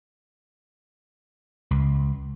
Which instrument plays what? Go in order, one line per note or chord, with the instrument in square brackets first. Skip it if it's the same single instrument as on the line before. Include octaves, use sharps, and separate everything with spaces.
[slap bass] C#2